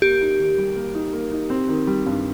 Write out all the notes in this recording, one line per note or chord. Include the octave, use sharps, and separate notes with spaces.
A#3 G4
D#4
D#3
G3
A#3
D#4
A#3
D#4
C4
D#3
G3
G2